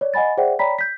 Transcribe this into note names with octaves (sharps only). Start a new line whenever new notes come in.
C#5 D5
D#5 F#5 G#5 B5 A6
G#4 C5 D5 E5 F#5 G5
C#5 D5 G5 A#5 B5 B6
G6 B6